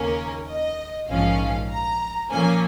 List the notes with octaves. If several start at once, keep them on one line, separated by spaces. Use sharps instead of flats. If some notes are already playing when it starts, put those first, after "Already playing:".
Already playing: D#2 C#3 A#3 C#4 A#4
D#5
A#1 G#2 F3 C#4 F5
A#5
A#2 F3 A#3 C#4 G#5